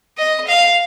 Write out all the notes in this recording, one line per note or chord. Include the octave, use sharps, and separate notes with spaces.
D#5
F5